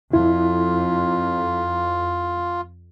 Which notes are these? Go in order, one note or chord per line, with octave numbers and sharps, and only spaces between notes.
F2 E4 F4